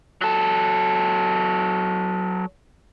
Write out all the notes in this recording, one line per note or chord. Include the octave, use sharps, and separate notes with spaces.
F#3 A4